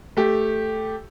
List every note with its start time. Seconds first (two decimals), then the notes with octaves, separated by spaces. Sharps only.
0.17 A3 G4